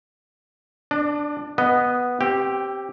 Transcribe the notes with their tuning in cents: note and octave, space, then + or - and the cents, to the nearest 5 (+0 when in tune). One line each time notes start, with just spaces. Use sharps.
D4 +0 D5 +40
B3 +0 D#5 +0
C4 +20 G4 -5